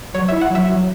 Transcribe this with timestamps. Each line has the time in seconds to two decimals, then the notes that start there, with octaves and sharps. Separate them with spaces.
0.14 F#3 C#5
0.28 E4 E5
0.41 F#5
0.50 F#3 E5
0.68 F#3